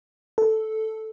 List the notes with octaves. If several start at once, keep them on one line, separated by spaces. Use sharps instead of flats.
A4